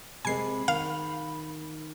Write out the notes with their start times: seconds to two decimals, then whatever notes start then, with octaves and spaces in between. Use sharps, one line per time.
0.25 C3 G#3 C4 G#5 B5 C7
0.68 D#3 F5